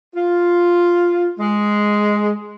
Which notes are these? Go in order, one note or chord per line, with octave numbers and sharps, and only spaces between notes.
F4
G#3